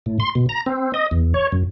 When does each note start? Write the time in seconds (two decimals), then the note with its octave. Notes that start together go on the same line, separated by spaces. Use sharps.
0.06 A2
0.20 C6
0.35 B2
0.49 A#5
0.66 C4
0.94 D#5
1.11 E2
1.34 C#5
1.52 F#2